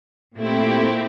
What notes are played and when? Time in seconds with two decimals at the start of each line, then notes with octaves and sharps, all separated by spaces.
0.38 A#2 A3 C4 E4 G4